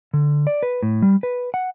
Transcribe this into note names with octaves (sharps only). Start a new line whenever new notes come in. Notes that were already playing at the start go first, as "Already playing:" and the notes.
D3
D5
B4
A2
G3
B4
F#5